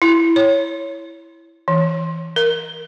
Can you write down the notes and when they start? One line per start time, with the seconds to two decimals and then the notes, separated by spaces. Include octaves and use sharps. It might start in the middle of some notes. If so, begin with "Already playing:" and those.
0.02 E4
0.36 C#5
1.68 E3
2.36 A#4